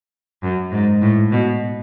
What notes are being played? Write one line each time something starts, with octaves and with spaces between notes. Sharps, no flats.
F#2
G#2
A2
B2